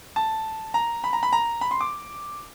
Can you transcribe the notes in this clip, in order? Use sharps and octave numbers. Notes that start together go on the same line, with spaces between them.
A5
A#5
B5
A#5
B5
A#5
B5
C6
D6